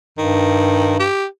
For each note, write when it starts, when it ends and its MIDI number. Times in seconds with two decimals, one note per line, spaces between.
0.18 1.05 43
0.18 0.97 51
1.00 1.26 67